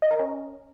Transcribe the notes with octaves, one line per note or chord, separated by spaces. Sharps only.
D#5
A#4
C#4